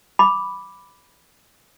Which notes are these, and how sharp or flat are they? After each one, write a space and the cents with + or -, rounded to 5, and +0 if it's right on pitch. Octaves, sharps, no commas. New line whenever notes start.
B5 +0 D6 +0